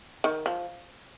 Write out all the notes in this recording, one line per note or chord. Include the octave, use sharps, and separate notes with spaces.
D#3
F3